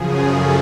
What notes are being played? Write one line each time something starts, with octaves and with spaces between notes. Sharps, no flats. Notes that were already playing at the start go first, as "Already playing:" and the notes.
Already playing: F#2 C#3 F3 G#4
A4